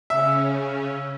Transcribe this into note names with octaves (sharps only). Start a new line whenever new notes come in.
C#3 C#4 E5